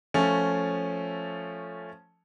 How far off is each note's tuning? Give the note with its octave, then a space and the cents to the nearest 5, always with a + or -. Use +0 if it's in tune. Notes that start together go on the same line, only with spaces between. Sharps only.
F3 +0 A3 +0 C#4 +0